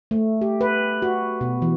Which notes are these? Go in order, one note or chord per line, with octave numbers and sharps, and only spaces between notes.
A3
G4
B4
F#4
B2
E3